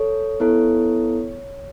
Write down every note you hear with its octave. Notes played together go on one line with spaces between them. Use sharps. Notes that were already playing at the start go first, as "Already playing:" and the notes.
Already playing: A4 C#5
B3 E4 A4